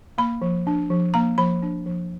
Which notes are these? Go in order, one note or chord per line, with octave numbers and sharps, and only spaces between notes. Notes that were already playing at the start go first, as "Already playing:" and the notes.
A#3 B5
F3
D4
F3
A#3 A#5
F3 B5
D4
F3